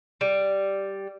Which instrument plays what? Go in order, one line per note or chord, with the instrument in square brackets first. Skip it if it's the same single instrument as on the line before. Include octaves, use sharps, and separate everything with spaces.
[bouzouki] G3